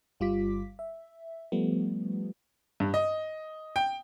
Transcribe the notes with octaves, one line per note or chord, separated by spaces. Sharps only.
G1 G3 F4 D6 B6
E5
F3 G3 A3 B3
G2
D#5
G5